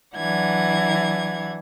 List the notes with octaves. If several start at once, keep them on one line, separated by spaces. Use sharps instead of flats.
E3 F#3 D4 F#5 G#6